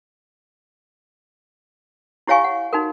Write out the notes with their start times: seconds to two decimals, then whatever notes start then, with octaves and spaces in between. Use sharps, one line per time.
2.27 E4 G4 C#5 F5 G#5 C#6
2.44 F#5
2.73 D#4 F#4 A#4